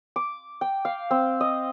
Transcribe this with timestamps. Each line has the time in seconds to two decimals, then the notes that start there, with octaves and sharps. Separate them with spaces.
0.16 D6
0.61 G5
0.85 F5
1.11 C4
1.41 D#5